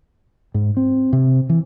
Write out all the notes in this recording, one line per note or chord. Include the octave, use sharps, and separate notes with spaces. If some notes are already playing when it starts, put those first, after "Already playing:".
G#2
C4
C3
E3